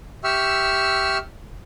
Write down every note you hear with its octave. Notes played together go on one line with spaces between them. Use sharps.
G4 E5 C#6 E6 F6